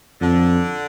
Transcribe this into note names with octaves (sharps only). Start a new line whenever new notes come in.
F2 D3